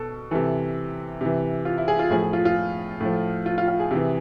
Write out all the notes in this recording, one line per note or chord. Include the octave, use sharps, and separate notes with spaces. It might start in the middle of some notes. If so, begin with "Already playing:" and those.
Already playing: B2 A4
C3 E3 A4
C3 E3
F4
E4
G#4
F4
A2 F3 G#4
G#4
F4
F4
A2 F3
F4
F4
F4
G#4
C3 E3